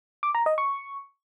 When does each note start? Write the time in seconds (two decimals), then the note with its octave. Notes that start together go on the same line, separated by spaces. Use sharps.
0.23 D6
0.35 A#5
0.46 D#5
0.58 C#6